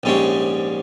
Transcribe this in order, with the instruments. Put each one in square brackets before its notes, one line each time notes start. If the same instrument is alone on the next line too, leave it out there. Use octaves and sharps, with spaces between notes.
[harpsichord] A#1 G#2 G3 C#4